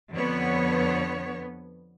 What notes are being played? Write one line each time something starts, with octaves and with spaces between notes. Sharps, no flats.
F2 D3 B3 C#5